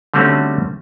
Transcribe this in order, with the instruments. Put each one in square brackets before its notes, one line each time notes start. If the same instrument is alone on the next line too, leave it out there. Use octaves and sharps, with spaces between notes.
[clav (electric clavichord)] D3 G3 A3 C4 C#4 F#4